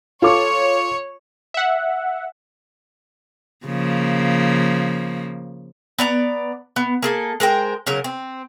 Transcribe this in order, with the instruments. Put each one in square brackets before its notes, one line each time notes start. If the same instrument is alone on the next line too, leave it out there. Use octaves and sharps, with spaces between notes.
[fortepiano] F4 A4 D6 [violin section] C#5
[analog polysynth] E5 F#5
[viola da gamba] C#3 F3 A#3
[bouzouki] B3 D5 A#5
B3
A#3 G#4 A4
G#3 A#4 C5 G5
C#3 F#3 A#4
C4